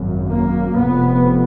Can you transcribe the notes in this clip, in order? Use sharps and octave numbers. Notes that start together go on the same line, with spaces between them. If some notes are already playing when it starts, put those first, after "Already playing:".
Already playing: G#1 F#2
A#3
F1 F2 B3